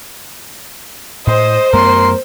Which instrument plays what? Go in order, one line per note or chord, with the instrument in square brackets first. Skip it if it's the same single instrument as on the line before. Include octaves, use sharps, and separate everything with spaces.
[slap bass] A2 [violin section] C5 [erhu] D#5
[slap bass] F#2 A3 B3 [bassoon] A#4 [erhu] C6